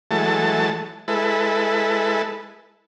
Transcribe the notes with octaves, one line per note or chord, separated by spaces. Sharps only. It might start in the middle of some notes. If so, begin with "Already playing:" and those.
E3 F#3 G#3 A3 A5
G#3 E4 A4 B4